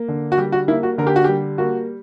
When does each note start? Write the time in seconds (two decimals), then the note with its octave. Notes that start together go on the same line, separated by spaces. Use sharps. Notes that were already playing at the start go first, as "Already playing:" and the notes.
Already playing: A#3
0.08 D3
0.32 F#4
0.38 G3 G4
0.52 F#4
0.68 A#3 E4
0.83 F#4
0.98 D3 A#4
1.07 G4
1.16 F#4
1.24 G3 G4
1.58 A#3 F#4